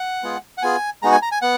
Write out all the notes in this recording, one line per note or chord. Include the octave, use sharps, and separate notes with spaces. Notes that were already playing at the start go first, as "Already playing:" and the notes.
Already playing: F#5
G#3 B3 F4 G#4
F#5
B3 F4 G#4 G#5
G#3 B3 D#4 F#4 A#5
G#5
A#5
G#5
B3 F#5